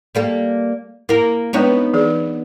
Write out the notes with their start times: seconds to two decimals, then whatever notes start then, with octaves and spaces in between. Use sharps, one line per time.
0.15 G3 A#3 A4
1.09 A#3 E4 A#4
1.53 G#3 B3 C4 D4 D#4 C#5
1.94 E3 G#4